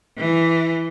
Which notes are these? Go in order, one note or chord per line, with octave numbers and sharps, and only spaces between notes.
E3